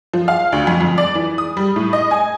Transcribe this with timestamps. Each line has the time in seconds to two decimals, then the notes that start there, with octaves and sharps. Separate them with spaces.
0.14 F3
0.28 F5
0.52 D2
0.67 F2
0.81 F2
0.98 D5
1.15 E3
1.38 D#6
1.57 G3
1.76 A2
1.93 D#5
2.11 G#5